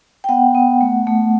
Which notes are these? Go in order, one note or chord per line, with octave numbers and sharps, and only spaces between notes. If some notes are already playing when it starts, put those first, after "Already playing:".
G5
B3 F#5
B3
A3
A3